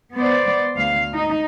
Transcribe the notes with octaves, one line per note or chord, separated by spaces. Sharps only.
B3 C5 D5
D2 F5
D#4